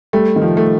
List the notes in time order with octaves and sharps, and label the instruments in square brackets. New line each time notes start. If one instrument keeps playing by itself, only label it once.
[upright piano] G3 [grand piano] A3
[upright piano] D#3
F3
[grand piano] A3